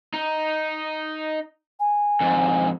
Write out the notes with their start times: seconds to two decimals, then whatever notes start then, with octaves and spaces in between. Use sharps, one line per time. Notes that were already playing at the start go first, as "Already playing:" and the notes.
0.14 D#4
1.80 G#5
2.20 F2 G#2